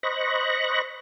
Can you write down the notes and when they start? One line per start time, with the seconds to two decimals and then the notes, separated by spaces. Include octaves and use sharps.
0.03 C5 D#5 B5 C#6 F#6 A#6